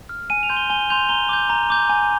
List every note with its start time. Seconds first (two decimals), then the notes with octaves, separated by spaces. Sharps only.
0.09 F6
0.30 G#5 D#7
0.43 F7
0.49 C6 G6
0.57 G7
0.70 G#5 G7
0.90 C6 G6 F7
1.09 A#5 G7
1.29 D6 G6
1.50 A#5
1.70 D6 G6
1.89 G#5